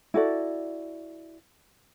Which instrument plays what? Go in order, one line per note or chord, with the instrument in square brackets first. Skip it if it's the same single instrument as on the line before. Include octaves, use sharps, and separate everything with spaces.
[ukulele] E4 F#4 A4 D5